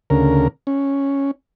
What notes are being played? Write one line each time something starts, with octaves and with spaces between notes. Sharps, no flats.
D2 C#3 A#4
C#4